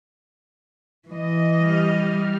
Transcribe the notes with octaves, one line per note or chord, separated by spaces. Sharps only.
E3 D#5
G3 F6